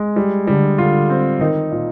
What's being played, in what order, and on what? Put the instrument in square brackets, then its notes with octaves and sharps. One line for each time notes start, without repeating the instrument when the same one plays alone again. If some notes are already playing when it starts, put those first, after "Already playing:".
Already playing: [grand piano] G#3
G3
[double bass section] D3 [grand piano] G3
[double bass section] D3 [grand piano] F4
[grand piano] C4
[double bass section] D#3 [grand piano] D#4
[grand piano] A#2